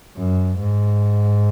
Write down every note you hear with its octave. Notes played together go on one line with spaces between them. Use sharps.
F#2
G#2